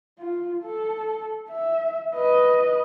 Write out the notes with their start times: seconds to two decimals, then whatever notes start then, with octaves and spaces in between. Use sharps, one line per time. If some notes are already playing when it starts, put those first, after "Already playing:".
0.19 F4
0.64 A4
1.50 E5
2.15 B4 D#5